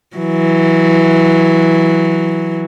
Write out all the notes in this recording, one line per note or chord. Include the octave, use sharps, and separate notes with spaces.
E3 F#3